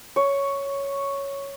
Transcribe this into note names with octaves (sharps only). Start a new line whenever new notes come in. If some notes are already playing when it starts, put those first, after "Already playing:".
C#5